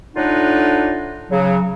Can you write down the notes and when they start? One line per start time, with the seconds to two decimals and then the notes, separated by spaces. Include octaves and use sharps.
0.16 A2 D3 D4 D#4 F4 F#5
1.31 C#3 F#3